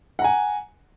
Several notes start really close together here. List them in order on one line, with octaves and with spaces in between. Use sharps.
F#5 A#5 G#5